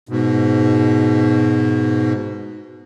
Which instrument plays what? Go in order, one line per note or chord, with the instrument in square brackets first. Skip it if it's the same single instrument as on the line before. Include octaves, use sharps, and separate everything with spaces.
[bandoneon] G#2 B2